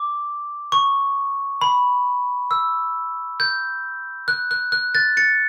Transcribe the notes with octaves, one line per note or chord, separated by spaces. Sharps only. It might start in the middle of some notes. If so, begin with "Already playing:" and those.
Already playing: D6
C#6
B5
E6
G6
F#6
F#6
F#6
F#6 A6
A6 C#7